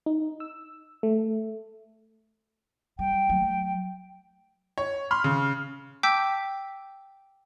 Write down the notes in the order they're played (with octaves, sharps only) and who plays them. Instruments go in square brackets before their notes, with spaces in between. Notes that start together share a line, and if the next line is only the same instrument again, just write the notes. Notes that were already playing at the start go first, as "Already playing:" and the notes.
[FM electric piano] D#4
E6
A3
[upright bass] G3 [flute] G5
[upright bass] F#3 A3
[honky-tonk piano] C#5
B5 C6 F6
C#3
[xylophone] G5 A5 D6 E6 G6 B6